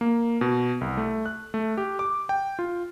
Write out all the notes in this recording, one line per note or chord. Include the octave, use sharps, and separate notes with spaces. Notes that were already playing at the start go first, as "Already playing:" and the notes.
A#3
B2
C2
A3
F#6
A3
G4
D6
G5
F4